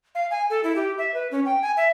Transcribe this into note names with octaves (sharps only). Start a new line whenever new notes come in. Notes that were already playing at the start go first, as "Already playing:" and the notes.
F5
G#5
A4
E4
G4
E5
B4
C#4
G5
G#5
E5